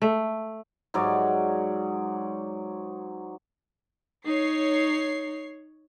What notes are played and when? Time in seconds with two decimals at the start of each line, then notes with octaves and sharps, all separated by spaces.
0.02 A3
0.94 G#2 F#3 D5
4.25 D#4 C#5 C7